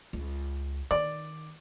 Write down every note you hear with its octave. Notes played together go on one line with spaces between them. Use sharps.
C#2
D#3 D5